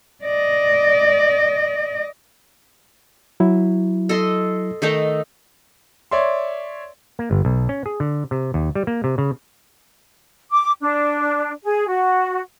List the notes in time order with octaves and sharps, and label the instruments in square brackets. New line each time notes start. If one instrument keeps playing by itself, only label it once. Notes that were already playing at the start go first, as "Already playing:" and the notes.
[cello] D5 D#5
[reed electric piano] F#3 E4
[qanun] A4 D#5 C6
D#3 A3 D#4
[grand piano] C#5 D5 E5 C6
[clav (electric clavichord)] A#3
G1
B1
C#4
G#4
D3
C3
D#2
G3
A#3
C3
C#3
[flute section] D6
D4
G#4
F#4